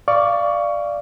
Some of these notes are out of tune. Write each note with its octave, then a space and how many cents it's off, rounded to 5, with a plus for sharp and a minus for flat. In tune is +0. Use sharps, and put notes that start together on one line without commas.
D5 +5 F5 -15 C#6 +20